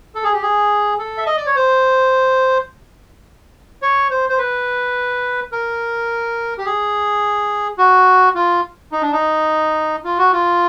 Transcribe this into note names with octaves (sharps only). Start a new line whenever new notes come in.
A4
G#4
G4
G#4
A4
E5
D#5
D5
C#5
C5
C#5
C5
C5
B4
A#4
G4
G#4
F#4
F4
D#4
D4
D#4
F4
F#4
F4